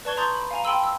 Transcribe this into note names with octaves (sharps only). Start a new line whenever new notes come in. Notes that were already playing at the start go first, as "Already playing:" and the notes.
B4 D5 A5 C#6 G#6 G7
A#5 C6 C#6 D#6 G6 A6
B5
F5 G#5 A#5
G5 A5 B5 C6 E6 D#7
E6